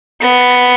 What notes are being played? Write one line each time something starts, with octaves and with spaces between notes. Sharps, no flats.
B3